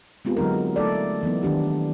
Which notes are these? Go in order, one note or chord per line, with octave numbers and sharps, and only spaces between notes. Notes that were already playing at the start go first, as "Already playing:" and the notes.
G#3 B3 C4 F4 G4
D3 F#3 G#3 D#4 A#4
A3 D#4 A4 D5
E3 F#3 B3 D#4
D#3 D4 G4